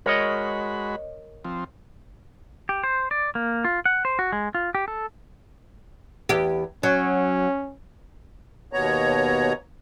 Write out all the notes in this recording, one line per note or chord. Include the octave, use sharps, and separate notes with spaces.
G#3 F#4 A#4 C#5 D#5 B5
F3 C4
G4
C5
D5
A#3
F4
F#5
C5
F#4
G#3
F4
G4
A4
E2 G4
F#3 C#4
D#2 B2 B3 C#5 A#5